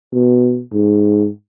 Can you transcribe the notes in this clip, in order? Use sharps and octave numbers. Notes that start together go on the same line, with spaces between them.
B2
G#2